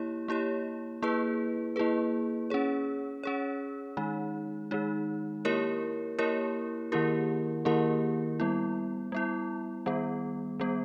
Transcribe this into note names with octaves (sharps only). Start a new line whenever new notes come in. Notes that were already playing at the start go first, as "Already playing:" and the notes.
Already playing: A#3 E4 G4 C#5
A#3 E4 G4 C#5
A#3 E4 G#4 B4
A#3 E4 G#4 B4
C#4 G#4 C#5
C#4 G#4 C#5
D#3 G#3 D#4
D#3 G#3 D#4
A#3 E4 G4 A#4 C#5
A#3 E4 G4 A#4 C#5
D#3 A#3 E4 G4 A#4
D#3 A#3 E4 G4 A#4
G3 B3 E4
G3 B3 E4
D#3 G3 B3
D#3 G3 B3